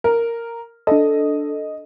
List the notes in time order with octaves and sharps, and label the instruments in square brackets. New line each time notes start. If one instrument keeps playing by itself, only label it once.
[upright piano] A#4
[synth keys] D4 A4 [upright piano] D#5